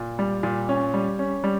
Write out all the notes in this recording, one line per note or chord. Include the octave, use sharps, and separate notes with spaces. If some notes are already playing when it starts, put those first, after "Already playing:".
Already playing: A#2
G3
A#2
C#4
G3
C#4
G3